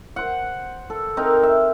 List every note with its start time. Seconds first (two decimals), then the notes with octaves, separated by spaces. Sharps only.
0.16 C5 F#5
0.90 A4
1.17 C4 D#4 A#4
1.43 E5